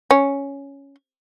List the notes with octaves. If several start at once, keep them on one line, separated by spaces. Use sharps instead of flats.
C#4